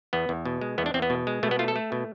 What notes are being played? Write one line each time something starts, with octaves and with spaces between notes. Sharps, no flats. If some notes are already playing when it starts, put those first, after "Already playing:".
E2 B3
E2
B2
G#3
E2 B3
D4
E2 C4
B3
B2
G#3
B2 A3
B3
A3 F4
A4
A3
B2